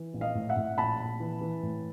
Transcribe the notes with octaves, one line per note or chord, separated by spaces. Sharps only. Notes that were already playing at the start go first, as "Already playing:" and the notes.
Already playing: E3
A#1
D#5 F5
A2
E5 F#5
A2
A#1 A5 B5
A#1
E3
E3
A2